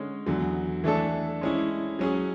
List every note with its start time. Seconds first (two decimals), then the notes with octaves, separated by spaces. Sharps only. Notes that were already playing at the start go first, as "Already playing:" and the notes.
Already playing: D3 G#3 C#4
0.26 E2 D3 F#3
0.84 E3 A3 D4 A4
1.41 G#3 C#4 E4
1.99 F#3 C#4 G#4